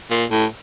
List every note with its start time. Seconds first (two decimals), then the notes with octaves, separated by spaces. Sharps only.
0.10 A#2
0.31 A2